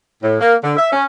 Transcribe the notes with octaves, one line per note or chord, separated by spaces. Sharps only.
A2
A#3
D3
E5
C#4